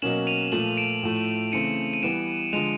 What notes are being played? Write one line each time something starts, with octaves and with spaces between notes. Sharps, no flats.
B2 F#3 A#3 C#4 E7 F#7
D#7 F7
A#2 F3 A3 E7 F#7
D7 E7
A2 F3 A3
C#3 E3 A3 C4 C#7 D#7
D#7
E3 G3 B3 D7 E7
D3 F3 G#3 D#7 F7